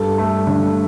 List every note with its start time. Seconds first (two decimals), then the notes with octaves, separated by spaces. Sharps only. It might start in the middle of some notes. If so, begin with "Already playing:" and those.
Already playing: G2 A4
0.18 A3
0.47 D3